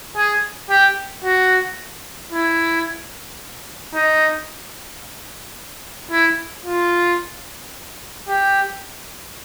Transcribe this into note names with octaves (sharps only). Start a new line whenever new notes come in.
G#4
G4
F#4
E4
D#4
E4
F4
G4